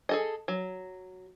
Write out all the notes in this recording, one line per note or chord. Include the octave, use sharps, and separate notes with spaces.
G#4 A4 D#5
F#3